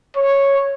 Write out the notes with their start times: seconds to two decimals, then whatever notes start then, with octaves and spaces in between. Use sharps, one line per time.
0.16 C#5